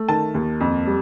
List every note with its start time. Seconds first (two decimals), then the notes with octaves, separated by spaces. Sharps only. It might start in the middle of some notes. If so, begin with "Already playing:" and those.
Already playing: A3
0.08 D#3 A5
0.34 D#2
0.60 F2
0.87 G3